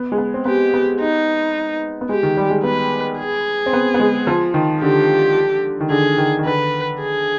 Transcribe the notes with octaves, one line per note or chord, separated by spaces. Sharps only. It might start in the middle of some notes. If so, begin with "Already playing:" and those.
Already playing: B3
G#3
B3
C4
B3 G4
B3
D#4
B3
G#3 G4
D#3
G3
G#3
B3 B4
G#4
C4
B3
B3
G#3
F3
D#3
D3 G4
D#3
D3 G#4
D#3
D#3
D3 B4
G#4